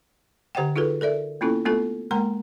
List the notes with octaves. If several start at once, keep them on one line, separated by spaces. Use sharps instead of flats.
D3 G4 C5 D#5 F#5 G5
D#4 F4 F#4 G#4 A4 B4
A4 A#4 D5 E5
A#3 B3 C#4 E4 F4 A4
A3 B3 D4 F4 A4
G#3 A#3 A#4 F#5 A#5 C6